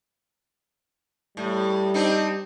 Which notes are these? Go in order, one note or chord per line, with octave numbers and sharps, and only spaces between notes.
A2 G3
C4 D4 D#4